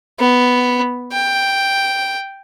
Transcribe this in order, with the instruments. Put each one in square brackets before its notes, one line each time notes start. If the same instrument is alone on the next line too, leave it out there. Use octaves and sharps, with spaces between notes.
[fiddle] B3
G5